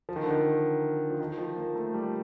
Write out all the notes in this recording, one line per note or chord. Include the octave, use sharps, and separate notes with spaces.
F3
D#3
D3
D#3
F3
D#3
F3
A#3
A3
G3